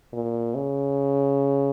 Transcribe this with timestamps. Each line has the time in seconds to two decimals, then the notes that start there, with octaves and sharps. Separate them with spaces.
0.13 A#2
0.55 C#3